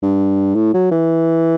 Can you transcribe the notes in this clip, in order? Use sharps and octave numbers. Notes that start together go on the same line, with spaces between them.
G2
A2
F#3
E3